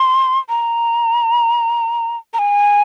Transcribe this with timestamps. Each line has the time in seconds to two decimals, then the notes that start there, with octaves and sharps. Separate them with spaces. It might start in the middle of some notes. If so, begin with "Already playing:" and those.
Already playing: C6
0.49 A#5
2.34 A#5
2.39 G#5